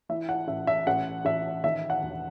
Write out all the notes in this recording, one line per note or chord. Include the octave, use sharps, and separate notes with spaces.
E3 E5
F#5
A1 E5
E5
A1 F#5
A1 E5
D#3 E5
F#5
E1